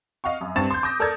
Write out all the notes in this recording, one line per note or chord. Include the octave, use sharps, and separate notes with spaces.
D#5 F5 F#5 C#6
F#2
G2 C4 C#6 A6 E7
C6 G6
D6 D#6 G6 A#6
A4 A#4 D5 A5 E6 G#6